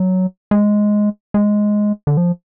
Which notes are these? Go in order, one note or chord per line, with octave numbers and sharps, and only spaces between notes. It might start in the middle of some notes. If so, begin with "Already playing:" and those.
Already playing: F#3
G#3
G#3
D3
F3